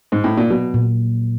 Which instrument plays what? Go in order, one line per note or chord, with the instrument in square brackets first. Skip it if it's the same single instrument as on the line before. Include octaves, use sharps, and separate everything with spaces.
[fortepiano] G#2
A2
A#2
[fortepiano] B2 [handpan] F#3
[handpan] A#2